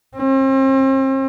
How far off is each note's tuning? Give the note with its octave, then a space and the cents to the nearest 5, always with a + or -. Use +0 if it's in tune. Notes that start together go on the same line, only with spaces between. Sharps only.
C4 +40